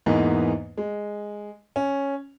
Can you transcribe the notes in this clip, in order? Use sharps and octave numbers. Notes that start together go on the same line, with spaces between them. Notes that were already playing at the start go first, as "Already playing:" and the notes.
E2 G#2 E3 A#3 B3 D#4
G#3
C#4